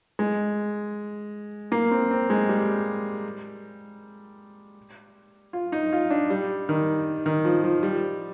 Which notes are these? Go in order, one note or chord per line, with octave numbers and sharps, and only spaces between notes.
G#3
A#3
C4
C4
G#3
G3
F4
D#4
F4
D4
G3
D#3
D#3
F3
F3
G3